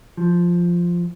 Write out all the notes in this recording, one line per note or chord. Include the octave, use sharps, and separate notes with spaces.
F3